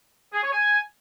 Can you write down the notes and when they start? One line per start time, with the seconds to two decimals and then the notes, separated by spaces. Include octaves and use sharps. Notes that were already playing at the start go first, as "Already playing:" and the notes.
0.33 G#4
0.43 C#5
0.52 G#5